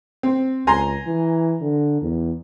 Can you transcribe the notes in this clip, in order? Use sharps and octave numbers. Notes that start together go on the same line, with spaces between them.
C4
C#2 G#5 A#5 C6
E3
D3
E2